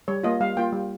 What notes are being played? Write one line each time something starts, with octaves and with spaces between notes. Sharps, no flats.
G3 C#5
A#3 F4 D#5
G3 F5
A#3 F4 G5
G3